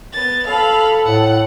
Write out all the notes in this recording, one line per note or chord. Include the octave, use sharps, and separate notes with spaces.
B3 A6
A4 F5 B5
A2 F#5